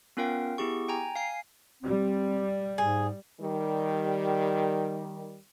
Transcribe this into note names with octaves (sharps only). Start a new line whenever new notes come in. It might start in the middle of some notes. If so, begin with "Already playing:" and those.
B3 C#4 F4 A#4 F5 G5
B3 E4 G4 G#4 C#6
G5 G#5 A#5
F5 G#5 C7
G3 C4
G#2 G#4
D#3 G3